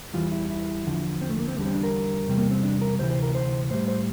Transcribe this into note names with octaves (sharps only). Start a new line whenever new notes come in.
E2 E3 G3 F4
E4
E4
E2 D3 F3
C4
A3
A#3
C4
E2 D3 G3 A#3
C4
D4
A#4
E2 C3 G3
A#3
C4
D4
A#4
D2 C3 E3 C5
C5
A#4
C5
A2 G3 C5
C5